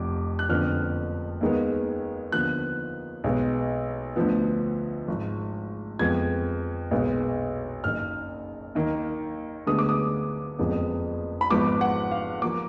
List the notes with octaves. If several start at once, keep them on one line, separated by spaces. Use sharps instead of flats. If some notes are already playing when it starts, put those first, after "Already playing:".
Already playing: F1 F2 F3 D6
F#6
F#1 F2 D3 F3 B3 F6
D#2 D#3 G#3 B3
D#2 D3 F3 B3 F#6
B1 B2 G#3 B3
D2 D3 F3 B3
G#1 G#2 F3
F2 F3 G#3 B3 G#6
B1 A#2 G#3 B3
F#1 F#2 D#3 F6
D#2 D#3 A#3
D2 D3 G#3 B3 D#6
D6
D#6
F#1 F2 F3 G#3 B3
B5
G#1 G#2 F3 B3 D6
F#5
F5
F3 A#3 D6